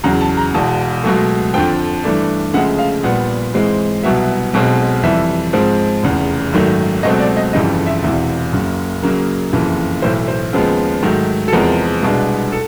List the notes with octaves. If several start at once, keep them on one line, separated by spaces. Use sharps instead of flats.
E2 C#3 F#3 A#5
A5
A#5
E1 E2 B2 A5
C#2 B2 F#3 A3
F2 D3 F3 G5
G2 E3 A3 D4
D2 C#3 F3 G#3 F#5
F5
A#1 A#2 G3 B3 F#5
G#2 E3 G#3 C4
C2 B2 F#3 B3 E5
B1 B2 G#3 C4
F2 C3 E3 G3 E5
G#2 F3 G#3 C4
F1 E2 C#3
G#1 F#2 D#3 F#3 A3
C#2 B2 F#3 A3 C4 D#5
D5
D#5
G1 F2 C#3 E3 G3 D#5
E5
E1 E2 C3 E3 E5
F#1 F#2 C#3
F#2 C#3 F#3 A#3
F#1 F2 C#3 E3
B1 A2 E3 C5
C5
D#2 C#3 F3 G#3 B3
G#2 D#3 F#3 A3
A4
E2 C3 F3 G#3 B3 A#4
C2 B2 G#3 B3 D4
A4